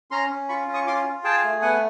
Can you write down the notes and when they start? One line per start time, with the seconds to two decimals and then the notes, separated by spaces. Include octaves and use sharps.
0.11 C#4 A#5 C6
0.30 C#4
0.49 F4 B5 C#6
0.68 C#4
0.74 C#6 D#6
0.87 F4 C6 D6
1.06 F4
1.24 G#4 G5 A5
1.44 A3
1.62 B3 F#5 G#5